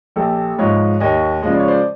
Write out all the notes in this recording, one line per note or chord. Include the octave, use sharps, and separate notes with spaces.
A#1 G4 A4
G#2 F3 G#3 C#5 D#5
D#2 C#5 D#5
C#3 F3 G#3 D#5
D5
C#5
C5 D5